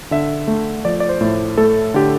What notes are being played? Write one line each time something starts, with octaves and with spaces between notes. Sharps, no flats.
D3 E5
A3
F3 D5
D5
C5
A2
A3 A4
D3 G4